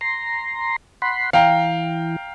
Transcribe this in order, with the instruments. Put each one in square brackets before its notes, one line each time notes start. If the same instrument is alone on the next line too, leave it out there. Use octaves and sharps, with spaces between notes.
[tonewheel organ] A#5 C6
F#5 B5 C6
[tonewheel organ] E3 [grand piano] F5 G5 A#5